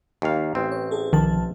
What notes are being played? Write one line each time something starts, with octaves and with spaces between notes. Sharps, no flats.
D#2 F5
A1 C4
C#5
G#4 A4
B1 D#3 F3 A5